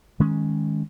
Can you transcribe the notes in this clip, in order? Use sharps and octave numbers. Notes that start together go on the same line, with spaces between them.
D#3 G#3 C#4